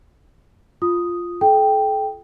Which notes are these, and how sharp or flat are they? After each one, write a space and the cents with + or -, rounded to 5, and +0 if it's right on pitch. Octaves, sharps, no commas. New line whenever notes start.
F4 +0 D#6 +0
A4 -40 G5 +0